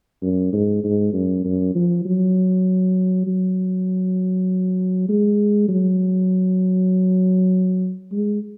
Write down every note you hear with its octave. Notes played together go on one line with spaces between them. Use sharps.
F#2
G#2
G#2
F#2
F#2
F3
F#3
F#3
G#3
F#3
G#3